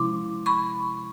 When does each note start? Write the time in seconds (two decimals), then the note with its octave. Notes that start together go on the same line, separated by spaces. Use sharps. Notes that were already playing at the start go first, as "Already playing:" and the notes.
Already playing: C3 F3 G#3 C#4 E4 C6 D6
0.46 B5 C#6